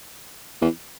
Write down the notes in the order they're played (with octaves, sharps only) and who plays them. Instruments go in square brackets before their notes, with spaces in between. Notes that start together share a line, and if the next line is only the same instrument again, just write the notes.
[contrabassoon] E2